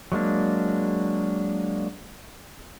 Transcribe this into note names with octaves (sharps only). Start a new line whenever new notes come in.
F#3 G#3 A#3 D4